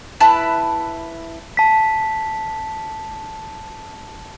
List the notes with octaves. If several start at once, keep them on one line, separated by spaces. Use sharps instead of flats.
E4 B4 A5 F#6
A5 B6